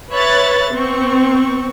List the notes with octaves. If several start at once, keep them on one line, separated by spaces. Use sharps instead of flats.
B4 C#5 E5 B5 F#6 A6
B3 C4 C#6